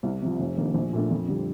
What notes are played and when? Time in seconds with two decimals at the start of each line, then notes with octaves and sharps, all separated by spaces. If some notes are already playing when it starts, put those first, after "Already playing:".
0.03 C2
0.22 C3 F3
0.39 F1
0.58 F2 D#3 A#3 D4
0.74 A#1
0.93 A#2 A3 D4
1.11 F2
1.28 D3 G3